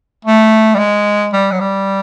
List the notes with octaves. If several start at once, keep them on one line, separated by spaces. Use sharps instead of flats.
A3
G3
G#3
G3
F#3
G3